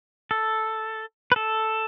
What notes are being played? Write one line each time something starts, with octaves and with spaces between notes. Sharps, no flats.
A4
B4
A4